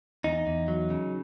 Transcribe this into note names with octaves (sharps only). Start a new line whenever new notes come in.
E2 D#4
E2
F#3
C#3